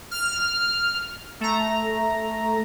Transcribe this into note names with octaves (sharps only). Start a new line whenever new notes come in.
F6
A3 A#5